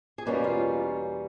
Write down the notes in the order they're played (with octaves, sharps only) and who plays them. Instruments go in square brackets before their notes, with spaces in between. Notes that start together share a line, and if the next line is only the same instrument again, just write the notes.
[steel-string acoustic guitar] G#4
E2 B2 G3 A#3 C#4 G4
F4